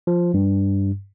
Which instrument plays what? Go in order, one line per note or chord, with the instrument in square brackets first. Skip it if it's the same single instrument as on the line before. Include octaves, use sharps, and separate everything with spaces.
[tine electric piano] F3
G2